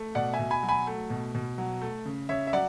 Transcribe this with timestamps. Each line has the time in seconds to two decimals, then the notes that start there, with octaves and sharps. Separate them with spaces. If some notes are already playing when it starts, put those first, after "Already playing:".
Already playing: A3
0.15 B2 D5 F#5
0.33 E5 G#5
0.39 B2
0.51 G#5 B5
0.63 F#3
0.68 G#5 B5
0.87 A3
1.10 B2
1.35 B2
1.58 F#3
1.81 A3
2.06 C#3
2.29 C#3 C#5 E5
2.47 E5
2.53 F#3 D5 F#5